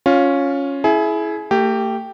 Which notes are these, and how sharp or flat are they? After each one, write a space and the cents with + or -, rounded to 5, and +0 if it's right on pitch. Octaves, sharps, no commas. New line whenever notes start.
C#4 +0 F4 +15
E4 +0 G#4 +30
A3 +40 G4 +0